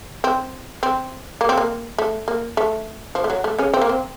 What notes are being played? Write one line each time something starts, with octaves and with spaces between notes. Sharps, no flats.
C4
C4
A#3
C4
A#3
A3
A#3
A3
F3
A3
F#3
A3
C#3 C#4
C4
A#3
C4